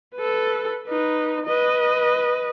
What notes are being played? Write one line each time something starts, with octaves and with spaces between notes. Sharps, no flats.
A4 B4
D#4 B4
B4 D#5